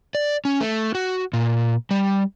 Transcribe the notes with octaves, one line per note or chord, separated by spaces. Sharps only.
D5
C#4
A3
F#4
A#2
G3